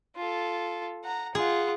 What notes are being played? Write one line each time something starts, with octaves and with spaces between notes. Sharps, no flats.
F4 A4
F#5 A#5
F4 G#4 F#5